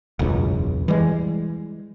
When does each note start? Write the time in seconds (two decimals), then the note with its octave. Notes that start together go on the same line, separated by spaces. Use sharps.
0.19 E1 C#2 F#2
0.88 E3 G3 G#3